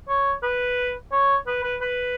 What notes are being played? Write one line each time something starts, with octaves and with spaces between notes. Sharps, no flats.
C#5
B4
C#5
B4
B4
B4